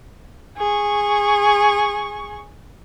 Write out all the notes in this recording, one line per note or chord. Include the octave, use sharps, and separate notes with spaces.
G#4 C#6